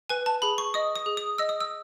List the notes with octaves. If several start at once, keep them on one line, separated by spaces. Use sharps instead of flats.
B4 G#5
A5
G#4 B5
C#6
D#5 D#6
D#6
G#4
D#6
D#5 E6
D#6
E6